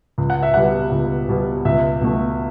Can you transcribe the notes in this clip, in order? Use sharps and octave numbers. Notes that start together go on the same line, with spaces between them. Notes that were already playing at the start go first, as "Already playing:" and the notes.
C#2
F#5
E5
B2 G3 B3 F#5
C#2
B2 G3 B3
C#2 E5
B2 A3